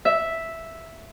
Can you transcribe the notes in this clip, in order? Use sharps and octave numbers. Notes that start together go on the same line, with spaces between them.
E5